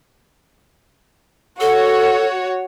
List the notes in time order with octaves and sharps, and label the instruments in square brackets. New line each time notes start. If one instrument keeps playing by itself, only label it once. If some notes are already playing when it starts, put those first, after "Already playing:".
[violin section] F#4 C#5 [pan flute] A4